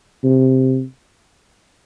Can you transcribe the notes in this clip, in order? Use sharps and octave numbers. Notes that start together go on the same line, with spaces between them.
C3